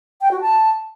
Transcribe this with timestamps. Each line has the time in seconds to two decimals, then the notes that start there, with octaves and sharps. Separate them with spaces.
0.21 G5
0.31 F#4
0.41 A5